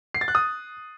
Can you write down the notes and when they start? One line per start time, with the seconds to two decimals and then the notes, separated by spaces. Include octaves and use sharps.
0.14 C7
0.21 A6
0.28 F#6
0.35 D#6